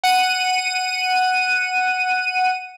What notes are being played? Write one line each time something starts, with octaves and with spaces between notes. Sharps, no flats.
F#5 D#7